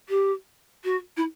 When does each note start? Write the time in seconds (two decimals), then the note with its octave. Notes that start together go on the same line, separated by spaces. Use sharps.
0.09 G4
0.84 F#4
1.16 E4